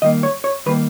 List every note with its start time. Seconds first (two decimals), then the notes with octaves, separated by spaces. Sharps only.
0.02 D#3 G3 A#3 D#5
0.23 C#5
0.44 C#5
0.66 D#3 G3 A#3 B4